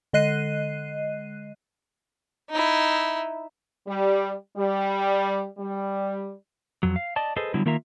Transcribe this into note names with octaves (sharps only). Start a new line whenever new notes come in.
D3 G#3 D#5 F#6 C7 D#7
D#4 E4
G3
G3
G3
F2 F#3
F5
D5 D#5 A5
G#4 A4 B4 C5 D#5
D3 F#3 G3 B3 E4
D#3 A#3 F4 A#4 E5 A#5